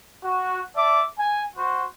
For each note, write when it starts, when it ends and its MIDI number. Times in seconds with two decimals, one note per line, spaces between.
0.22 0.60 66
0.76 1.02 74
0.76 1.02 76
0.76 1.02 81
0.76 1.02 86
1.19 1.43 80
1.56 1.84 66
1.56 1.84 72